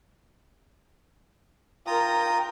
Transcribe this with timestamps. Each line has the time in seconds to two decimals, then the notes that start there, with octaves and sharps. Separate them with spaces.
1.87 F4 A#4 G5 A#5 D#6